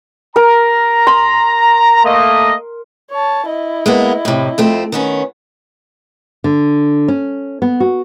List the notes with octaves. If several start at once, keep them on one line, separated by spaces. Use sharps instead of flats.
A#4 A#5
C6
A3 A#3 D#5
C#5 A5
E4 D#5
G#3 A#3 B3
A2 C3
F2 A3 C4
D#3 B3 C#4
D3
C#4
B3
F#4